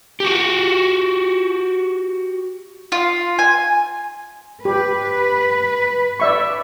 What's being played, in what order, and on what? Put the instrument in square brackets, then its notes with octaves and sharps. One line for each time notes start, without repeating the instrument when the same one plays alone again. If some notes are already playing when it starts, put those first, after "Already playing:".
[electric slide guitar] F#4 G4
[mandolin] F4
G#5
[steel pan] G4 [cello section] B4
[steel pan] D5 E5 C#6